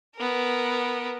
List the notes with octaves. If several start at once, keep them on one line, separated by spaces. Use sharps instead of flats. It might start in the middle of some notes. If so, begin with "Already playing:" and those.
B3 A#4